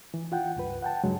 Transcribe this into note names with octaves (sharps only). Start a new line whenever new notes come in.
E3
F4 F#5 G5
C#2 G2 B4
F#5 G5 A5
G2 C#3 F#3 G#3